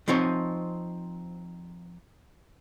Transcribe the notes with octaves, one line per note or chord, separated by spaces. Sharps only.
F3 C4 D#4 C#5